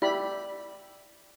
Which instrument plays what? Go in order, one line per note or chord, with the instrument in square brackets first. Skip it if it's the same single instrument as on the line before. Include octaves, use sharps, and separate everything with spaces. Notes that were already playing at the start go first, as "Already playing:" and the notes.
[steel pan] E4 G4 B5 [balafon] D5